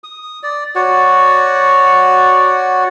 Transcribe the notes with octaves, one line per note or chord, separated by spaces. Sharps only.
D#6
D5
F#4 C#5 D5 F#5